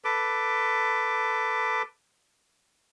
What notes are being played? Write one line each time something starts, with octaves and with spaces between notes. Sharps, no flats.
A4 B4 D6